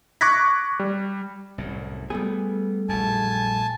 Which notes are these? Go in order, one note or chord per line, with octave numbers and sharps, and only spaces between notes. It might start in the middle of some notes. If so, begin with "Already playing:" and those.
C#6 D6 F#6 G#6 A#6 B6
G3
C2 F#2 A2
G3 A3 B3 G#4
A#1 F#2 G#5 A5